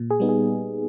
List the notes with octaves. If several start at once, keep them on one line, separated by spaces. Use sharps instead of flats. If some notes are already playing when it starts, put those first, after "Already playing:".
Already playing: A#2
G#4
G3 B3 D#4
G#4